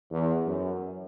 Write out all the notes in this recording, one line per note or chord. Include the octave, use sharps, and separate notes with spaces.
E2
F#2